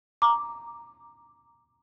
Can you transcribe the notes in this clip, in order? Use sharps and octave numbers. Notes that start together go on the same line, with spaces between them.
A#5 D6